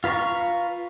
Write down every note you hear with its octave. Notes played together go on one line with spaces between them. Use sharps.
F4 B4 F5 A#5 C#6